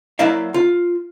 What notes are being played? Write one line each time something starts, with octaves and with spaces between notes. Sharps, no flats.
F#3 A#3 E4 D5 E5 F5
F4